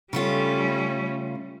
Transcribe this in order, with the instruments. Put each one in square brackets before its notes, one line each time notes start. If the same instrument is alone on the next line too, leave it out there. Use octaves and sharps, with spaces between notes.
[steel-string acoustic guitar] C#3 A3 F4 [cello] G3 C#4